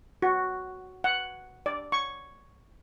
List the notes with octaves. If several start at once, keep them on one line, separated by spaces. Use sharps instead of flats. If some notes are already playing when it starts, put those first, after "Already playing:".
F#4
F#5
D5
C#6